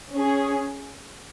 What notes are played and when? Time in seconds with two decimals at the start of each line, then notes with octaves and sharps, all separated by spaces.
0.14 C#4 G#4